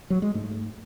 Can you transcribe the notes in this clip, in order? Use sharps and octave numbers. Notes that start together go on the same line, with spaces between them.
F#3
G#3
G#2 A3